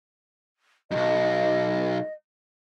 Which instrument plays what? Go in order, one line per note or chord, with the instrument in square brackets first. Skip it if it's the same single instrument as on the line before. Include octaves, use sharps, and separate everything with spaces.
[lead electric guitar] B1 F#2 [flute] D#5